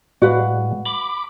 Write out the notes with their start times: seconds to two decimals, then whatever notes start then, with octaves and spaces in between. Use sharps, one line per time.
0.22 A2 G3 G#3 F#4 B4 F5
0.86 B5 D6